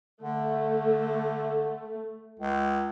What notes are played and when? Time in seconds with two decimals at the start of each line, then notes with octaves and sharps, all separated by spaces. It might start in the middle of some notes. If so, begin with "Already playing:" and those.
0.22 D3 A3
2.40 C#2